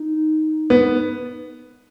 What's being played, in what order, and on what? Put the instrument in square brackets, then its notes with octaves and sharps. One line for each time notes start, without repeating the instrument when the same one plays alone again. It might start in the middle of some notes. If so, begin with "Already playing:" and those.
Already playing: [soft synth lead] D#4
[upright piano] B3